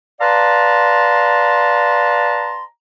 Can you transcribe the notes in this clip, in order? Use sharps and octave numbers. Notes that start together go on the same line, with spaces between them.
B4 D5 F5 A5 A#5 C6